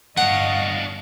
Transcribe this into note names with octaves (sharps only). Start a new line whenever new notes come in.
G1 D4 C#5 D#5 F5 F#5